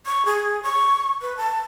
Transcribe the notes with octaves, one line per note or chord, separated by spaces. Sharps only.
C#6
G#4
C#6
B4
A5